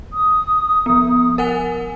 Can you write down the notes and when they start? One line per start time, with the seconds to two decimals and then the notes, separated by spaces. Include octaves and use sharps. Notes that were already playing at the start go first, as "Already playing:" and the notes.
0.13 D#6
0.86 F3 B3
1.38 A#4 F#5 G#5